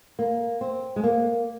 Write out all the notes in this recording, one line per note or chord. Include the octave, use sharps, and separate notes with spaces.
A#3
C4
G#3
A#3